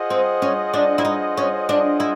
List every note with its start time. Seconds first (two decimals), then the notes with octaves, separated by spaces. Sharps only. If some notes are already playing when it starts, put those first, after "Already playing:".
Already playing: F4 G#4 C5 D#5 F#5
0.10 C4
0.42 C#4
0.74 D4
0.98 E4
1.05 D#4
1.37 C#4
1.69 D4
2.00 E4